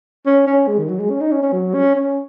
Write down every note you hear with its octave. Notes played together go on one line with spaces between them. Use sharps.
C#4
C#4
G#3
D#3
F#3
G#3
C#4
D#4
C#4
C#4
F#3
C#4
C#4